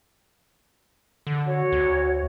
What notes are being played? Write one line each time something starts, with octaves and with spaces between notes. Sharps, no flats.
D3
F#4 C#5
D2